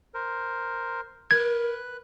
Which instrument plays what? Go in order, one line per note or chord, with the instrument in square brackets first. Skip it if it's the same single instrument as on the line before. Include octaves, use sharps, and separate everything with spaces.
[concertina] A#4 C5
[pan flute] A#4 [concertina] B4 F#6 [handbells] G#6